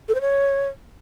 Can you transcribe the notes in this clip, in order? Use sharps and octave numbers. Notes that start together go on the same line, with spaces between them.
A4
C5
C#5